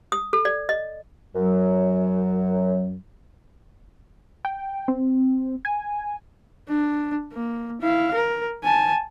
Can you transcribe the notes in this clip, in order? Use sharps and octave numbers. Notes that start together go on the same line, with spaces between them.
D#6
A4
D5
D#5
F#2 F#3
G5
C4
G#5
D4
A#3
E4 F5
A#4
G#5 A5